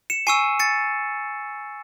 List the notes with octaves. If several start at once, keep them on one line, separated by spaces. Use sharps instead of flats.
C#7 E7
G#5 C#6 E6 C7 D#7
A6 C#7